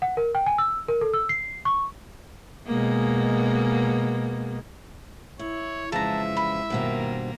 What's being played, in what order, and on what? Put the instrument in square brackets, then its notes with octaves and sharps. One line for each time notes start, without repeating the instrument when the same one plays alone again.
[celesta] F#5
A#4
G5
G#5
E6
A#4
A4
E6
C7
C#6
[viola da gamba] B2 G#3 A#3
[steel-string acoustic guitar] E4 [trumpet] C#5
[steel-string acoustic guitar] F2 C#3 E3 [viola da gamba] G#3 [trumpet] E5 [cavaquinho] A5 A#5
[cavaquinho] B5
[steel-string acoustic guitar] G2 B2 C4 [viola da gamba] D#3 A#3